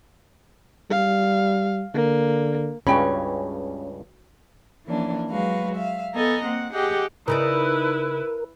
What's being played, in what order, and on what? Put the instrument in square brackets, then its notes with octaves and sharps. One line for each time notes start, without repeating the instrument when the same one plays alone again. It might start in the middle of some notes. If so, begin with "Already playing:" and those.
[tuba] G3 [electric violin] F5
[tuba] D3 [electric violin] A#3
[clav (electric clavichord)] C#2 G2 C#3 [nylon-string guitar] C#4 [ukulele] F#4 G5 B5
[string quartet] E3 F3 A#3 C#4 D4
F#3 G#3 F#4 B4 F5
E5 F5
B3 A4 D#5 G#5 A#5
A#3 C4 F#5
G4 G#4 D#5 F#5 G5
[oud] C#3 D#4 D5 [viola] E4 B4 [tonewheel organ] A#4